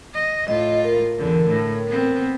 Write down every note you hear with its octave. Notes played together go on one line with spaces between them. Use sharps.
D#5
A2 F4 D#5
A#4
E2 D3
A2
B3 C4